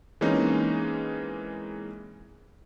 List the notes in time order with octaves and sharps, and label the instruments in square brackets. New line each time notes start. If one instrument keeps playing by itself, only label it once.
[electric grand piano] E3 G#3 A#3 C4 C#4 D#4